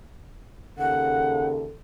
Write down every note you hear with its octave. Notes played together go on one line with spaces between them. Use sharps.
D#2 C#3 A4 F#5